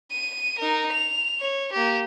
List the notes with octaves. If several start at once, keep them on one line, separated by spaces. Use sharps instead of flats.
D#7
D#4 A#4
F7
C#5
A#3 G4